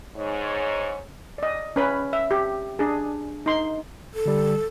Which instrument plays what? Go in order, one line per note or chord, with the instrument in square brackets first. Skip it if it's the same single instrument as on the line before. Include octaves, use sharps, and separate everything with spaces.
[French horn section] G#2 C#5
[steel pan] D5 D#5
C#4 B4 B5
E5
G4
D4 G#4
D#4 C6
[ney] A4
[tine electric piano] D3 G3